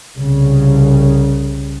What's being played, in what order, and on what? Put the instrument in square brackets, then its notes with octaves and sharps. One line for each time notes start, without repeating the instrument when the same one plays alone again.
[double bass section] C2 C#3